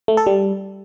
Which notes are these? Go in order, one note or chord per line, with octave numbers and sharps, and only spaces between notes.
A3
A4
G3